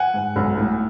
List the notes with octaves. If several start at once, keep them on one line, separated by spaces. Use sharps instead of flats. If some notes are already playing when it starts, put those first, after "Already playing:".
Already playing: F#5 G#5
G#2
B1
A2